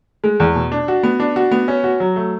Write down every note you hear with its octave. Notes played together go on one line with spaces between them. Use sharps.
G#3
E2
B2
D4
F#4
B3
D4
F#4
B3
C#4
F#4
F#3
A3